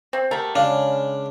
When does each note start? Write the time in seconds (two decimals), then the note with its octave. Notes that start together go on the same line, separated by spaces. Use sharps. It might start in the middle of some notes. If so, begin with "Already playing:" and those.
0.13 C4
0.31 A3 G4 A#4 E5 F#5
0.56 C#3 G#3 D4 F5